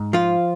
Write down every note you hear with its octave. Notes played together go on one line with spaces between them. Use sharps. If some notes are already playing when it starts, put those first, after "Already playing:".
Already playing: G#2
F3 F4